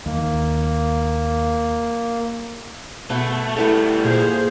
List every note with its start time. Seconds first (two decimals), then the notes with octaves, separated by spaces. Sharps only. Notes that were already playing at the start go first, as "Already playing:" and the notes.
0.06 D#2 A#3
3.10 B2 A3
3.57 G3 A3 B3 E4 A4
4.04 A#2 F4 G#4 C5 F5